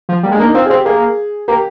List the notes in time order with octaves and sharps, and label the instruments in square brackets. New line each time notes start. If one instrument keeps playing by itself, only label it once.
[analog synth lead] F3
[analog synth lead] G3 [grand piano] A#3
[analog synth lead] G#3
[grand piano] D4
[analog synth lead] A#3
[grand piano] D#4
[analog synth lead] C4 [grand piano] F4
[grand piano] G#4
[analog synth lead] C4 [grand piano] G4
[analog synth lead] A#3 [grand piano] G#4
[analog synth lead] A#3 [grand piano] G4